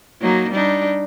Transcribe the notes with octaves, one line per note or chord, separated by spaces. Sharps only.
F#3 A#3 D#4
G3 D4 D#4